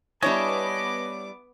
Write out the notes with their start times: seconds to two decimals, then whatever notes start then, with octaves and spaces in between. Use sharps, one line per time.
0.22 G3 B3 D4 E4 C#5 D#5 G#5 D6